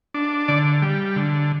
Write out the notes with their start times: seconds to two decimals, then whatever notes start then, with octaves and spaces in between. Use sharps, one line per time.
0.14 D4
0.48 D3 D5
0.82 G3
1.16 D3